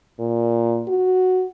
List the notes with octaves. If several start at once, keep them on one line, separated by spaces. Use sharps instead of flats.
A#2
F#4